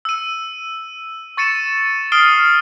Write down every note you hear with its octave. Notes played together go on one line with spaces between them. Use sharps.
E6 D#7
C#6 A6 C#7 D#7 E7
D#6 F6 C7 D7 D#7 G7